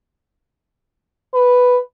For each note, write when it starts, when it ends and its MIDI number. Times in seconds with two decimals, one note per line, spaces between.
1.34 1.79 71